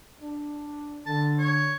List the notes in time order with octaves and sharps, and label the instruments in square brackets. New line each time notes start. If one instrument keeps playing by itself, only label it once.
[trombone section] D4
[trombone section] D3 [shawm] A5
[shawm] C#5